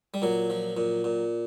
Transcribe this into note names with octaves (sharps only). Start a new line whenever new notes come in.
G3
A#2 F#3
F3
A#2
A#2